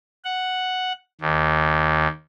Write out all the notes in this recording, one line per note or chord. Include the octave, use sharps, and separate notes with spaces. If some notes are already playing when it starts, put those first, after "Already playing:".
F#5
D#2